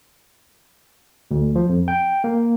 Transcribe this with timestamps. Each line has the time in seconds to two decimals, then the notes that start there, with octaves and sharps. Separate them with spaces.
1.31 D2
1.55 F3
1.69 F2
1.88 G5
2.24 A#3